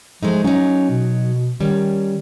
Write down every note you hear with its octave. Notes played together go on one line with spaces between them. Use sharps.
F3 G#3 A3 D#4
F#3 C#4 D#4
B2
D#3 G3 C#4